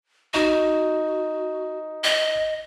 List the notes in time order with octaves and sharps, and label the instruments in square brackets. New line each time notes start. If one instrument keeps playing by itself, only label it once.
[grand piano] D#4 [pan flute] F#4
[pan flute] D#5